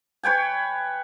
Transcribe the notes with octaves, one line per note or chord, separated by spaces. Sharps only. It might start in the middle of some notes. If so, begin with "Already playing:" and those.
B4 C#5 G5 G#5